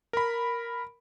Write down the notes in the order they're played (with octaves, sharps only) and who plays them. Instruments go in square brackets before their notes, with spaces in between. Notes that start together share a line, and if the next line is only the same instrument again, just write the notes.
[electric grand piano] A#4 B5